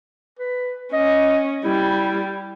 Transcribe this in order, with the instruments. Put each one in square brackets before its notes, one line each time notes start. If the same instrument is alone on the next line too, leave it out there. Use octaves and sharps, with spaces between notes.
[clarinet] B4
[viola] C#4 [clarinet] D#5
[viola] G3 [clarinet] E4